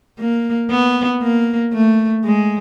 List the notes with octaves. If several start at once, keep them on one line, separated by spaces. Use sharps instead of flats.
A#3
B3
A#3
A3
G#3